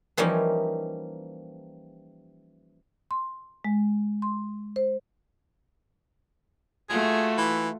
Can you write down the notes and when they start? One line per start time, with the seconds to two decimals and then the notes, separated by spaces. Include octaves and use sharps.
0.17 E3 F3 G3 A#3 C#4 D#4
3.11 C6
3.64 G#3
4.22 C6
4.76 C5
6.90 A3 F4 F#4 G#4
7.38 E3